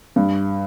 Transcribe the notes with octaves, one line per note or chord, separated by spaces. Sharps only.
G2